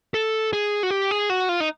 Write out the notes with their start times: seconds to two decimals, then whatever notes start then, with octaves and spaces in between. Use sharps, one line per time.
0.14 A4
0.53 G#4
0.83 F#4
0.91 G4
1.11 G#4
1.30 F#4
1.49 F4
1.60 D#4